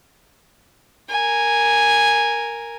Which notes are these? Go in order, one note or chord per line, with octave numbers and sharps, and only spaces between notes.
A#4 G#5